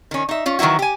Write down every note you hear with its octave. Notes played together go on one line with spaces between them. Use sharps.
D#3 C#4
D#4 E5
C#4 F4
D#3 E3 F#3 E4 F#4
G4 G#5